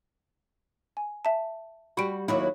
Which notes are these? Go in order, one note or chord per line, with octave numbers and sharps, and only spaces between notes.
G#5
E5 A5
G3 F#4 B5 D7
D#2 F#3 E4